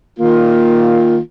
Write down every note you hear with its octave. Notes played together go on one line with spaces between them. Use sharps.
D#3 A#3 F4